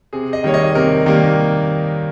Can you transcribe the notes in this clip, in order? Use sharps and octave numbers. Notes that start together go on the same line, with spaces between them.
C3 G#4
D#5
D#3 G3 A#3 C#5
D#5
C3 A#4
D#3 G3 A#3